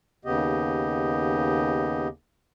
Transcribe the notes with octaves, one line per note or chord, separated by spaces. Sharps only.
D#2 C#3 B3 G4 D#5